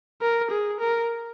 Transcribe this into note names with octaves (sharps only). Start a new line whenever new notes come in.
A#4
G#4
A#4